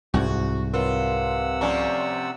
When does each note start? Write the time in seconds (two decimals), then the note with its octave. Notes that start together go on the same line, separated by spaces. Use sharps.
0.14 C2 G#2 F#4
0.74 C3 F4 A#4 B4 C#5 F#5 E6
1.61 F3 A3 C#4 D5 A#5